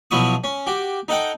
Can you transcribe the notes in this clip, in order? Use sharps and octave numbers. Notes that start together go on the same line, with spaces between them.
B1 F3 F#3 E4 C#6 D#6
C#4
F#4 G4
D#4 A4 F#5 G5